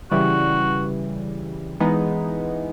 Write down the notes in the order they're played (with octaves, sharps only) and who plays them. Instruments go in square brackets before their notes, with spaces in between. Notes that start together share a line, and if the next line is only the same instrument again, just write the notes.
[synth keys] C#3 E3 G3 [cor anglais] F#4
[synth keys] E3 G#3 B3 D#4